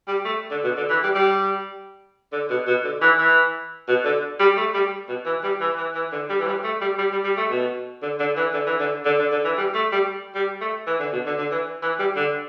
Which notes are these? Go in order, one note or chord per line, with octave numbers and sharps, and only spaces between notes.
G3
A3
D3
B2
D3
E3
G3
G3
D3
B2
B2
D3
E3
E3
B2
D3
G3
A3
G3
B2
E3
G3
E3
E3
E3
D3
G3
E3
G3
A3
G3
G3
G3
G3
A3
B2
D3
D3
E3
D3
E3
D3
D3
D3
D3
E3
G3
A3
G3
G3
A3
E3
D3
B2
D3
D3
E3
E3
G3
D3